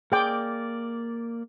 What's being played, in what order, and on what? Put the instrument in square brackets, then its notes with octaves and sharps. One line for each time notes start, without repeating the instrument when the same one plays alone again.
[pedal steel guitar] A#3 D5 [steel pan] G#4 G5 D6